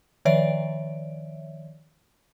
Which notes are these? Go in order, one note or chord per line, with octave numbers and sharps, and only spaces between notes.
D#3 F3 C#5 D5 E5 D7